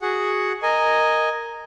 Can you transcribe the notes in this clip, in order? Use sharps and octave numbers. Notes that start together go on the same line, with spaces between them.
F#4 G#4 F#5
A#4 D#5 G#5